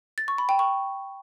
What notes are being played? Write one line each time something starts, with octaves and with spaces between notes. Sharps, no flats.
A6
C#6
B5
G5
C#6